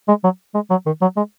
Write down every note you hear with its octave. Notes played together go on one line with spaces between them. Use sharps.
G#3
F#3
G#3
F#3
D#3
F#3
G#3